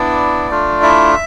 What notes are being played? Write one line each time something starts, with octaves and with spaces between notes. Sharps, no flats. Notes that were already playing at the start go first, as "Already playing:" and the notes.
Already playing: B3 D4 E4 D5
A3 D4 F4
E4 E5